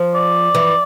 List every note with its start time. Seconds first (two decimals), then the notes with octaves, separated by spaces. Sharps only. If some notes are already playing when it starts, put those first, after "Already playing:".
Already playing: F3
0.15 D5
0.55 E3